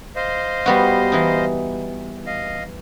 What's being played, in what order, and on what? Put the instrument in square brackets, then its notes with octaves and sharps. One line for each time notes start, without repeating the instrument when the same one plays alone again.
[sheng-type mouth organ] C5 D#5 F5
[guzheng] G3 B3 F#4
E3 D#4
[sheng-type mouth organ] D#5 F5